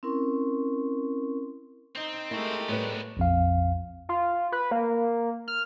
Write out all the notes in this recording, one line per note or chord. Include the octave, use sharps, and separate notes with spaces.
C4 C#4 E4 A#4 C6 C#6
C4 D#4
G#3 A3 E4 G4 A#4
A2 G3 B3 D4 B4
A#1 F2 F5
F4
B4
A#3
F6